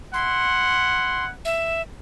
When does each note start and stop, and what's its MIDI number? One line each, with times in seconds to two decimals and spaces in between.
0.14 1.31 64
0.14 1.31 78
0.14 1.25 84
1.45 1.81 76